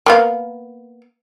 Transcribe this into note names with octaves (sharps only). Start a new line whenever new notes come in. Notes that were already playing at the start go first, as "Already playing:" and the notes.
A#3 B3 F5